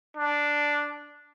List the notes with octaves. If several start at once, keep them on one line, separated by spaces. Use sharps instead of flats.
D4